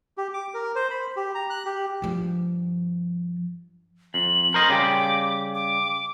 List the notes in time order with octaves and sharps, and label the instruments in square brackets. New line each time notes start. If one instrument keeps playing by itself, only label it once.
[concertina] G4
D6
A#4
C5
B5
G4
A#5
F#6
G4
[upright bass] G2 F3
[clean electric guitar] F2 [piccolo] F#7
[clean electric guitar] A#4 C5 D#5
[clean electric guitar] C#3 G3 G4 [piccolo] D6
[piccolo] D6